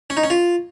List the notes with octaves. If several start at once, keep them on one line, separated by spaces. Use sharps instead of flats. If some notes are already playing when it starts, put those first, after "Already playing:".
C#4
D#4
C#4
F4